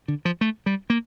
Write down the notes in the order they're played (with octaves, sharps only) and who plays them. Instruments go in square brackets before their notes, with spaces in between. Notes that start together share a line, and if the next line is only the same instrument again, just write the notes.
[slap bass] D3
F3
A3
G3
A#3